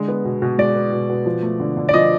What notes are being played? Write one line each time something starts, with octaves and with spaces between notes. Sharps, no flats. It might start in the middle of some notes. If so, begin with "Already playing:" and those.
Already playing: D3 G#3
B3
B2
B2
G#3 D5
B3
B2
B2
F3
A3
D3
D3
D5
F3 D#5